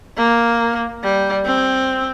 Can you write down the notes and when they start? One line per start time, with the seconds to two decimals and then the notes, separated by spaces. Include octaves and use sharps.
0.17 A#3
1.03 G3
1.45 C4